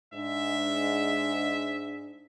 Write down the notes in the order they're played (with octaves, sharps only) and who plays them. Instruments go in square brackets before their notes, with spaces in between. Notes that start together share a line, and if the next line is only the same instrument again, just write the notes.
[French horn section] G#2 D4 [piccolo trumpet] E5